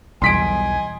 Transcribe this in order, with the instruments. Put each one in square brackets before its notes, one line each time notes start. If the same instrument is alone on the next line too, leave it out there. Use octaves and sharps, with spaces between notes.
[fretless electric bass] B1 E2 [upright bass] G3 [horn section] D#5 G#5 [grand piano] C6 B6 D7